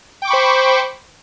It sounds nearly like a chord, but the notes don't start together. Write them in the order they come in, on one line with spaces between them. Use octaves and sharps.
G5 D6 C#6 B5 C5